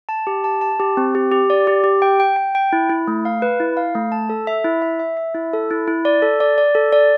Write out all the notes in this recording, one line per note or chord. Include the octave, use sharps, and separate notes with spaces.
A5
G4
A5
A5
G4
C4
G4
G4
D5
G4
G4
G5
G5
G5
G5
E4
E4
A3
F5
B4
E4
F5
A3
A5
A4
E5
E4
E5
E5
E5
E4
A4
E4
E4
D5
A4
D5
D5
A4
D5